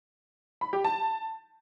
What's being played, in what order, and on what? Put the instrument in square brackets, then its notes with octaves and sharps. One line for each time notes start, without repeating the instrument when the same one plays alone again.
[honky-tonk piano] B5
G4
A5